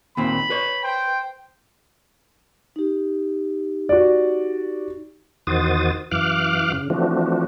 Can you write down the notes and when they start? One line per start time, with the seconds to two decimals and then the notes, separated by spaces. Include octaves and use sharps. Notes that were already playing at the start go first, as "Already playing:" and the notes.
0.17 D#2 A#2 C4 B5
0.50 B4 C#5
0.84 C5 G5
2.76 D#4 G4
3.89 F#4 D5
5.47 E2 D#3 F#4 C5 D#6 A6
6.11 F#2 E3 F5 D6 F6 F#6
6.73 C#3
6.90 E3 F3 A3 C4 D4 F#4